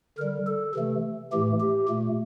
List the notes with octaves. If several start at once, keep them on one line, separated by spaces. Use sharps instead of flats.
D3 G3 A#4
A4
C3 E3 A3
A2 E3 A3 G4
G4
A#2 A3